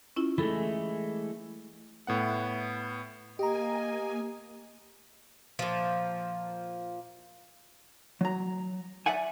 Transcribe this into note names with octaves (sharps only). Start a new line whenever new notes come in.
C#4 E4 F4
E3 G#3 A3 A4 B5
A2 B3 F#5
A#3 G4 D#5 G#5 A#5
A#2 F3
F#3 A#5
D5 E5 F#5 G#5